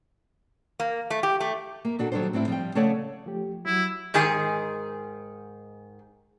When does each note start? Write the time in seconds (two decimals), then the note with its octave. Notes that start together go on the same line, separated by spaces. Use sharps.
0.80 A#3
1.10 A3
1.23 G4
1.40 A3
1.85 A#3
1.99 A#2 D4 F#4 A4
2.12 D#3 F#3 G3 D4 A4 C5
2.33 A2 C4 D4 E4
2.48 F3 G3 G4 G5
2.75 C#3 A3 A4 C#5 D5 F#5
3.26 F3 A3 G4
3.66 F#3 E4 F#4
4.14 G#2 D#3 G#4 G#5